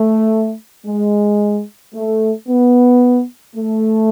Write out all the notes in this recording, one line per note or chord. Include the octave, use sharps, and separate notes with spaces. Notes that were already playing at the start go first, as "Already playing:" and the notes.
Already playing: A3
G#3
A3
B3
A3